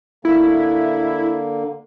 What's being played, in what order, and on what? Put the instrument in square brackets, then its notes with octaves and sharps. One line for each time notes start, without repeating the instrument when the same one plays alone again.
[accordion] D3 A#3 [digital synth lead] E4